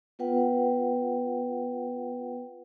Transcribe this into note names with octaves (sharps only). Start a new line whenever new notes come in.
B3 F4 B4 F#5 G5